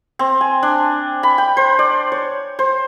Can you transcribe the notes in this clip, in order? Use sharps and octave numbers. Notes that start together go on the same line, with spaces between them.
C4
G#5
D4
B5
G5
C5
D5
C#5
C5